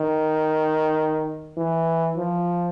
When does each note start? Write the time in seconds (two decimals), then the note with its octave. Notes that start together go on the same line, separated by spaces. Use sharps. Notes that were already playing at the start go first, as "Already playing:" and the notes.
Already playing: D#3
1.57 E3
2.17 F3